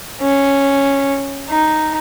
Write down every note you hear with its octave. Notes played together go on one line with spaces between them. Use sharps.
C#4
D#4